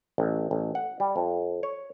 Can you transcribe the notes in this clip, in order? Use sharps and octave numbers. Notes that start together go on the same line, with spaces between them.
A1
A1
F#5
G3
F2
C#5